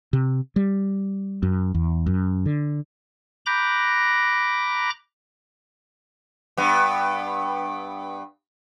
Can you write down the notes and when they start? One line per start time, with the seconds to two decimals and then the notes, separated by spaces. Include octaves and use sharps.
0.13 C3
0.56 G3
1.43 F#2
1.74 E2
2.06 F#2
2.46 D3
3.46 A#5 B5 D6 F#6 G6 A#6
6.57 G2 B3